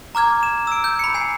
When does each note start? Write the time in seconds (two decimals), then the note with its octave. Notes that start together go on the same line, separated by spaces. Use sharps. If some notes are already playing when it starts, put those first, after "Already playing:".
0.15 A#5 D6 F6 G#6
0.43 E7
0.67 E6 D7
0.84 G6
0.99 B5 C#7
1.14 G#5 C7